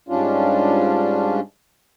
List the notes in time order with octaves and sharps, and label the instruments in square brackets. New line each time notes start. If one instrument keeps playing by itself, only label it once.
[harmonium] G#2 G3 C#4 D4 F4